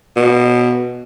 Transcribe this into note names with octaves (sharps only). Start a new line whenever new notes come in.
B2